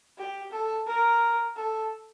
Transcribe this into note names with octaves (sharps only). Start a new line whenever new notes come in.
G4
A4
A#4
A4